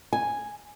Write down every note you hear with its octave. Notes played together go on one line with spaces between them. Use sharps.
G#5